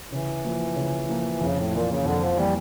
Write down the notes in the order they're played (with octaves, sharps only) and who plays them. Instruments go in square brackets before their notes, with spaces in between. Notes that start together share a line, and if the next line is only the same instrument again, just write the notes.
[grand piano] C#3 [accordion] E3
[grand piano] F3 A#3
C#3
F3 A#3
[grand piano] F2 [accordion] C#3
[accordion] A2
[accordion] A#2 [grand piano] E3 A#3 E4
[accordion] C#3
[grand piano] F2 [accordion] D3
[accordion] F3
[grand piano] E3 A#3 E4 [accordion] G3